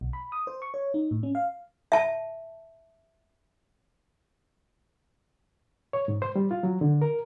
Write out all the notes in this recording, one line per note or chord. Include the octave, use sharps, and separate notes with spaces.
B1
B5
D#6
C5
C#6
C#5
D#4
A2
C#4
F5
E5 A5
C#5
G#2
C5
G3
F4
F#3
D3
A#4